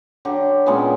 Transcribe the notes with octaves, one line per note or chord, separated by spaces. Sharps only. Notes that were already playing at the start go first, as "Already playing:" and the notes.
D3 F#3 G4
A#2 C#3 G#3 B3